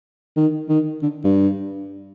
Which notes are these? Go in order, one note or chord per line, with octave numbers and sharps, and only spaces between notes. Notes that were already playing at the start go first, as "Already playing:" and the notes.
D#3
D#3
D3
G2